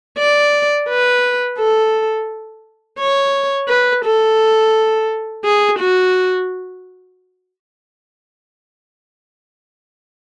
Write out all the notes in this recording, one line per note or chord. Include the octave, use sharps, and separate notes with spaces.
D5
B4
A4
C#5
B4
A4
G#4
F#4